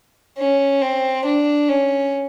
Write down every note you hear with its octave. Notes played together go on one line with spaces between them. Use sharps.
C#4
C4
D4
C#4